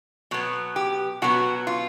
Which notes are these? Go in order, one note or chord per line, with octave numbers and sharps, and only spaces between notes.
B2 F#3 B3
G4
B2 F#3 B3 F#4
F4